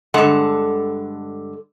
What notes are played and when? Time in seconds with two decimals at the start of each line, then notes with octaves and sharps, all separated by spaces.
0.14 G2 D3 G#3 A4 F#5